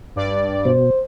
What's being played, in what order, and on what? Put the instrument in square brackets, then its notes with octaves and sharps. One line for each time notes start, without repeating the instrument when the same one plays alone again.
[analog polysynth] G2 D5
[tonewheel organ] B2 [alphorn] C5